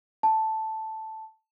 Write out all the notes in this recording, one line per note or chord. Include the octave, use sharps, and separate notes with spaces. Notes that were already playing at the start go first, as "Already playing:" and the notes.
A5